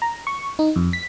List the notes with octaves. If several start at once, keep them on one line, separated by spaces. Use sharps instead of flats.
A#5
C#6
D#4
F2
B6